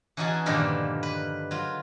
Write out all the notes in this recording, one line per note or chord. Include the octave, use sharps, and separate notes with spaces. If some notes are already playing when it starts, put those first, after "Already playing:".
E3 C#4 D#4 F#4 G#4 A5
G2 A#2 D3 D#3 F3 G3
B4
F#3 F4